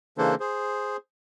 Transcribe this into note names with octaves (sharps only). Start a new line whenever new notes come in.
C#3 E3 A#3 D4 A4 C5
G#4 C5